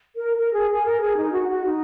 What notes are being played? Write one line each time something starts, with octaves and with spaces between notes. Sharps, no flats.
A#4
A#4
G#4
G#4
A#4
G#4
D#4
F#4
F#4
D#4